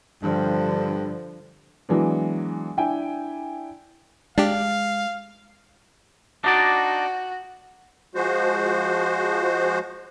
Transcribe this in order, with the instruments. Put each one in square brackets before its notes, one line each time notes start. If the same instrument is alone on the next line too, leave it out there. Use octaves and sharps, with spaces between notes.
[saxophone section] G2 [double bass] D3 F3
[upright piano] E3 F#3 G#3 B3 D4
D4 E4 G5 G#5
[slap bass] G#3 [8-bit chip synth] D4 G4 [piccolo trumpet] F5
[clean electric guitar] D4 D#4 D5 [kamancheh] F#4
[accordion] F3 G#3 F#4 C5